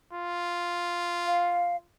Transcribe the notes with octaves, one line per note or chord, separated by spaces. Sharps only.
F4
F5